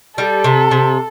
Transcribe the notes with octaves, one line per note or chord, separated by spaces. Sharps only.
G3 A4
C3
C3